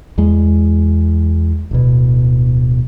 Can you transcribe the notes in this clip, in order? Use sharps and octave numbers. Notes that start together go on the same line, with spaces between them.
E2 G#3
D1 B2